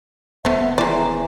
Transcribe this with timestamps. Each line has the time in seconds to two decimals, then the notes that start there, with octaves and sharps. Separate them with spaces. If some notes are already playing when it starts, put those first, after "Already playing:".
0.45 D#1 F3 A3 B3 E5
0.78 E3 G#3 C5 D5 A#5